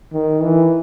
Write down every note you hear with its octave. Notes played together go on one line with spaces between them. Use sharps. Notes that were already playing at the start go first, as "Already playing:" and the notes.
D#3
E3